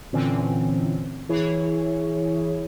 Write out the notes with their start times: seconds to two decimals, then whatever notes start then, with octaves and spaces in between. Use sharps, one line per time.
0.13 A#2 D3 E3 C4 C#4
1.29 E3 E4 G#4 C#5